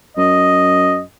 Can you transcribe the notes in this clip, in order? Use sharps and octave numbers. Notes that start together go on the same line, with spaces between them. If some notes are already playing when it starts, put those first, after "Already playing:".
F#2 D#5